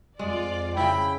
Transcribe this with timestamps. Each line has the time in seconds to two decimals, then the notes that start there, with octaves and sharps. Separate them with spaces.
0.19 F2 G#3 F4 D5
0.77 C#3 E4 G5 B5